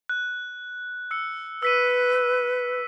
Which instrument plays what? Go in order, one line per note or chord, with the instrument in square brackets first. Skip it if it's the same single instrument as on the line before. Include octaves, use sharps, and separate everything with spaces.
[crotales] F#6
E6 C#7
[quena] B4 [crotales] E6 B6 D#7